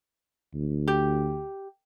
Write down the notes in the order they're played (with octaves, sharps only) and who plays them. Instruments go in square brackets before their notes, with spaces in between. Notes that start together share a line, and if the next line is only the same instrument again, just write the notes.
[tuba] D2
[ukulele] G4